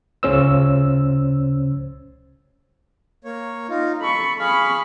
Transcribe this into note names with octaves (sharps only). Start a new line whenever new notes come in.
C#2 C#3 C#4 C5 E6
A#3 C#5
D#4 F4
A4 B5 C#6
G#4 F5 B5 C#6